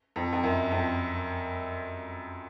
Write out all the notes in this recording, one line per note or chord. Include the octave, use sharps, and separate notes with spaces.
F2
F2
F#2
F2